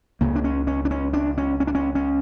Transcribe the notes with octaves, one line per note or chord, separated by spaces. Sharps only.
C#2 C#3 A#3
D4
C#4
C#4
D4
C#4
D4
C#4
C#4
D4
C#4
C#4